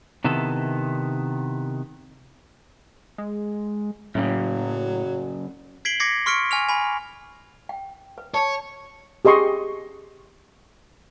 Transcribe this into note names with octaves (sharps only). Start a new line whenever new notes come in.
C3 D#3 B3 E4 A4
G#3
F#2 A2 C#3 F#3
G#6 B6 C7 D7 F#7 G7
D6 G#6 A#6 C7 C#7
C6 C#6 F6 B6 C#7 D7
G#5 F6 F7
G#5 B5
G5
B4
C#5 A5
G4 G#4 D#5 C6 C#6